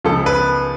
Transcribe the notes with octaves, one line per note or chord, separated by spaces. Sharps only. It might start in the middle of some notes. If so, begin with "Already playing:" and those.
C#2 C#3 F3 A4
B4